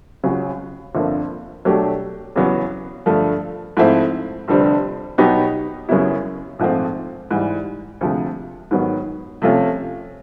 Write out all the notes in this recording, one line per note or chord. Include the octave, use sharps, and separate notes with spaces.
C#2 C#3 F#3
G1 F2 D3 F3 A#3
B2 F#3 A3 D4 G4
E2 C#3 F#3 B3
G2 D3 F3 A3
G#2 F3 A3 C4 E4
F1 F2 D3 G3 C4
B2 F#3 B3 D#4 G4
F#2 C#3 F#3 B3 E4
A#1 G#2 F3 A3 C4
G#2 E3 G3
D2 C3 F3 G#3
G#2 D#3 F#3 B3
C3 F3 A3 C#4 F4